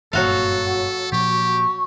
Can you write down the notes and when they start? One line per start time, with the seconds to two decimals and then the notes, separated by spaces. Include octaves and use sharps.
0.13 F#1 G2 A#2 F#3 F#4 A4 F5
1.12 A#2 F3 G4 C#6